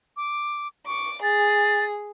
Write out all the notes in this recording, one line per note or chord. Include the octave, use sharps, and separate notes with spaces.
D6
C#6 D6
G#4 A6